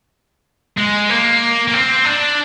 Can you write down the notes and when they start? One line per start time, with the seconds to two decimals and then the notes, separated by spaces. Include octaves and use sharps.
0.77 G#3
1.09 A#3
1.68 A#3
1.73 C4
2.05 D4